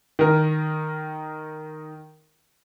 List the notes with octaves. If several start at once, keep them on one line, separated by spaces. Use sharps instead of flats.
D#3 A#4